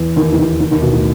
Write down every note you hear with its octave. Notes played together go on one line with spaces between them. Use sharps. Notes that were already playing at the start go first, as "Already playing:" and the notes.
Already playing: E2 E3
D#2 D#3
E3
D#2 D#3
D#2 D#3
D#2 D#3
B1 B2
A2